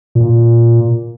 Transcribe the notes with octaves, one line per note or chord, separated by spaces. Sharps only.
A#2